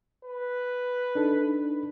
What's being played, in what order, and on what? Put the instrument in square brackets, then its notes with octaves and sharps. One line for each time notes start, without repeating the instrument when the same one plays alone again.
[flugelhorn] B4
[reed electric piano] D4 D#4 A4